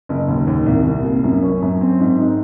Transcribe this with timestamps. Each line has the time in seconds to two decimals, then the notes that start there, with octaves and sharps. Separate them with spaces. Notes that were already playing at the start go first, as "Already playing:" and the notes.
0.09 F#1
0.28 D#2
0.47 D#2
0.66 C2
0.86 C2
1.04 A#3
1.24 F#2
1.42 C#4
1.62 F#2
1.81 C4
2.00 G#2
2.19 D#4